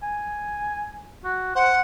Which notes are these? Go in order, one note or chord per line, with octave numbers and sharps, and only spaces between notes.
G#5
F#4
C5 F#5